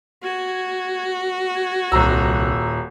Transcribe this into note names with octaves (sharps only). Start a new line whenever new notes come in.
F#4 G#6
G#6
D#1 C2 A#5 E6 F#6